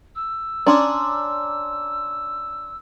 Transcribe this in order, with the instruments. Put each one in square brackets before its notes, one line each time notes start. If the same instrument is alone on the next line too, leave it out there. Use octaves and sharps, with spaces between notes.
[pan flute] E6
[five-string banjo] C#4 D4 [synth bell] A#5 C6 D6